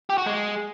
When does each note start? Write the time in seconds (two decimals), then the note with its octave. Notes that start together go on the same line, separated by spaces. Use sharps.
0.10 G4
0.18 F#4
0.26 G#3